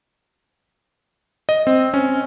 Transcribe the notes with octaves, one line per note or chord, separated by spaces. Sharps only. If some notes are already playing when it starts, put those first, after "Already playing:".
D#5
C4
C#4